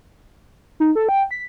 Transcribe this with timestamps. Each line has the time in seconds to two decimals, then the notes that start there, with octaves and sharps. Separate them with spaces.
0.80 D#4
0.95 A4
1.09 G5
1.31 B6